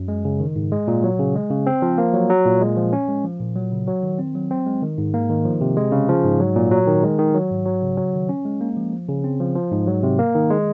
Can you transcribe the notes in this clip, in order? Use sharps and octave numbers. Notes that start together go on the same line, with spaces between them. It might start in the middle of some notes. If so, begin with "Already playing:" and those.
Already playing: F#2
G#3
C#3
D#3
G#2
G#3
A#2
F#3
C#3
G#3
C#3
C4
F3
A#3
F#3
F#3
A#2
G#3
F3
C#4
G#3
F3
A#2
F#3
C#3
F#3
D#3
C4
F#3
C4
G#3
D#3
G#2
A#3
D#3
F3
C3
G#3
C#3
F3
G#2
F#3
A#2
F#3
D#3
G#3
D#3
F#3
G#2
F#3
C#3
F#3
D#3
C#4
G#3
A#3
F3
F3
C#3
C4
F3
F3
G#2
F#3
C3
A#3
D#3
G#3